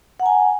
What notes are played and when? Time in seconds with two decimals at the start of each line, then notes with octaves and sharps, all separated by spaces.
0.20 F#5
0.23 A#5
0.26 G#5